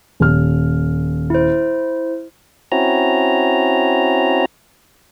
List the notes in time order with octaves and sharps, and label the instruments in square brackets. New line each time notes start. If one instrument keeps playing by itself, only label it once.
[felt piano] D#1 F6
[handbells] E4 C5
[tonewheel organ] C4 C#4 E4 F#4 A#5